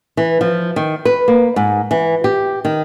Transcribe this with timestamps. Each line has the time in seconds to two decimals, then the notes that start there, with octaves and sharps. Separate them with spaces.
0.17 E3
0.41 F3
0.76 D#3
1.05 B4
1.28 A#3
1.56 G#2
1.91 E3
2.24 G4
2.65 D#3